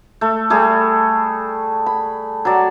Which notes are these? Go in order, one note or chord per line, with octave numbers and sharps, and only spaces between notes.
A3
G3 A3 G#4
B5
F#3 D5